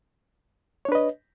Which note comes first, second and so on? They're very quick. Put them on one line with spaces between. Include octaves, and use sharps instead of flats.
C#5 D4 B4 D#5